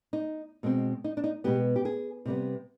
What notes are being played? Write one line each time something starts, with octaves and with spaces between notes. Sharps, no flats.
D#4
B2 G#3 C4
D#4
D4
D#4
B2 G#3 B3 G4
G4
G#4
C3 G3 B3